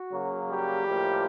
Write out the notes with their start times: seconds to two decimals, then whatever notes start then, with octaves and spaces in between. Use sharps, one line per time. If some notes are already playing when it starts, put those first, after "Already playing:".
Already playing: F#4
0.12 C#3 F#3 A#3
0.49 G3 G4
0.87 A2 F3 A#3